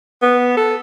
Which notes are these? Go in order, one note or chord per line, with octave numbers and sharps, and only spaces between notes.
B3
A4